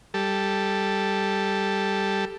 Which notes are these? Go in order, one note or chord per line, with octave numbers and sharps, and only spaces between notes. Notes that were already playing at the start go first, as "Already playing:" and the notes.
G3 A4